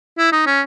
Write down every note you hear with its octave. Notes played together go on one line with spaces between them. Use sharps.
E4
D#4
C#4